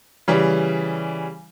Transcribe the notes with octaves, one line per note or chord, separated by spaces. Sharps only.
C#3 E3 G3